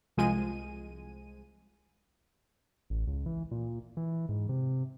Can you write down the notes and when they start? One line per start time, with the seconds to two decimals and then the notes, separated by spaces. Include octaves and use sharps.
0.17 C2 F3 G#3 G#5 D#7
2.90 A1
3.07 C#2
3.26 E3
3.51 A#2
3.97 E3
4.29 G#2
4.49 C3